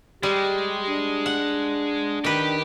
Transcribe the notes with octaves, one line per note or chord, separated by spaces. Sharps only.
G3 G#3 G4
D4
F#5
D#3 G4 B4